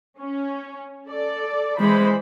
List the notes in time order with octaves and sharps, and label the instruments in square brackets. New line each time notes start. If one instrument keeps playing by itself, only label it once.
[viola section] C#4
A4 D5
[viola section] E3 C5 B5 [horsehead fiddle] G#3